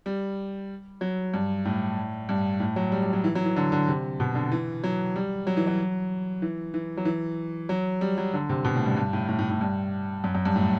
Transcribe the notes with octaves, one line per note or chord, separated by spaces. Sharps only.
G3
F#3
G2
A2
G2
A2
F#3
G3
G3
F#3
E3
F#3
E3
D3
D3
C3
B2
D3
E3
F#3
G3
F#3
E3
F#3
E3
E3
F#3
E3
F#3
G3
F#3
D3
C3
B2
A2
G2
G2
A2
A2
A2
A2
G2
F#2
F#2
G2
A2